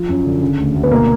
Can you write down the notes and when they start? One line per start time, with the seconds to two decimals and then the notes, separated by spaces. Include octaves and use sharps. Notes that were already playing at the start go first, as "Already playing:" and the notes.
Already playing: F3
0.09 F#2
0.25 D3
0.42 C#3
0.58 D2
0.75 D2
0.83 B3
0.91 B2 A#3